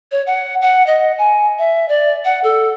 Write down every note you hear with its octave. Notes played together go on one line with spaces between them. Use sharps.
C#5
F#5
F#5
D#5
G#5
E5
D5
F#5
A4